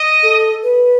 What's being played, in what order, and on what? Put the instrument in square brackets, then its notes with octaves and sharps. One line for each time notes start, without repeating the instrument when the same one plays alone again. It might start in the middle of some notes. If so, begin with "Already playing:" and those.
Already playing: [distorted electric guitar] D#5
[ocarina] A4
B4